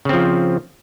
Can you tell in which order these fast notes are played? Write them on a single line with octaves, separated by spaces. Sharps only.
C#3 C4 F3